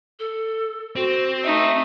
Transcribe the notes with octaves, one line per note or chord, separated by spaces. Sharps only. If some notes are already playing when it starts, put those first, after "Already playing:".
A4
C4 F#4
A3 D#4 E5